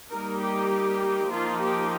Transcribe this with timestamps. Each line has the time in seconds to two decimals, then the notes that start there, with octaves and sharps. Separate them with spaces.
0.11 G3 A#3 D#4 A#4
0.41 G4
1.31 F3 A#3 D#4 F4
1.61 G4